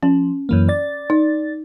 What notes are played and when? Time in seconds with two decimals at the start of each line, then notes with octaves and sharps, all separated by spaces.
0.03 F3 C#4
0.49 F#2 E3 A#3
0.69 D5 A6
1.10 D#4